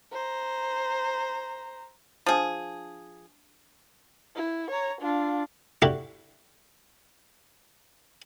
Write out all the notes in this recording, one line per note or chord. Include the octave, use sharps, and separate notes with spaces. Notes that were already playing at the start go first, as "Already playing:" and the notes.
C5 A#5
F3 D4 G#4 A5
E4
C#5 A#5
D4 F4
D4 E4 F#4 G4 A4